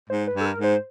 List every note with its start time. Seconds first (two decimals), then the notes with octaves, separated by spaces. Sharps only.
0.10 G#2 C5
0.28 B4
0.34 G2
0.41 A4
0.46 A#4
0.58 G#2
0.64 C5